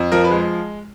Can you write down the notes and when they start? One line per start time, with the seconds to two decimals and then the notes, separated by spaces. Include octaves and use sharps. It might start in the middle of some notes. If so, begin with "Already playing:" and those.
Already playing: F2
0.12 F3 A#4
0.24 B4
0.30 G#3